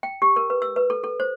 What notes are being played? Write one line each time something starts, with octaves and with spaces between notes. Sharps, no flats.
G5
G4
A#4
B4
E6
B4
A4
A4
C5